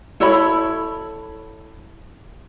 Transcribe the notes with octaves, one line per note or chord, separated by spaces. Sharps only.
E4 A4 C#5 B5